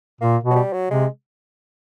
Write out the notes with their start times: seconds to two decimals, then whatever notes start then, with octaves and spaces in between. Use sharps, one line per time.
0.21 A#2 A#3
0.44 B2
0.51 F#3
0.56 G3
0.73 F#3
0.90 C3 G#3